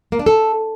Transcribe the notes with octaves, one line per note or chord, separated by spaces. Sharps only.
A#3
D4
A4